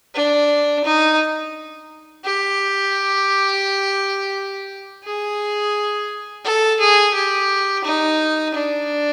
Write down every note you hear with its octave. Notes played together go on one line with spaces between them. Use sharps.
D4
D#4
G4
G#4
A4
G#4
G4
D#4
D4